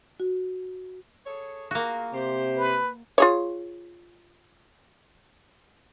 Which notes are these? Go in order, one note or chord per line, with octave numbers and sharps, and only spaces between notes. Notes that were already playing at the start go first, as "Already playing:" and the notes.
F#4
G#4 A4 C#5
A#3 F4 F#4 G#4
C3 G4 C5
B4
F4 G#4 C#5